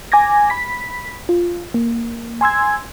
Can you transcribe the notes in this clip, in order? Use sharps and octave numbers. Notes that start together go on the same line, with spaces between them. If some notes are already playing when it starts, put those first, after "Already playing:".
G#5 D6 G#6 A#6
B5 B6
F4
A#3
G#5 C6 E6 G#6